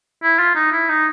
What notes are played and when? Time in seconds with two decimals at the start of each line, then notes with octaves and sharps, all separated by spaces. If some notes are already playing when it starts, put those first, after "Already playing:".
0.23 E4
0.39 F4
0.55 D#4
0.72 E4
0.89 D#4